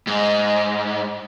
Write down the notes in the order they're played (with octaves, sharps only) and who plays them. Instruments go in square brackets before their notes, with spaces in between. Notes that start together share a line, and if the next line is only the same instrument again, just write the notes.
[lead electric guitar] G#2 [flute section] D#5 G#5